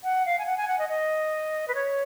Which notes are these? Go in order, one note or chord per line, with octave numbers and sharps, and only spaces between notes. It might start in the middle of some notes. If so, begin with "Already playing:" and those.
F#5
F5
G#5
F#5
G#5
F#5
D#5
D#5
B4
C#5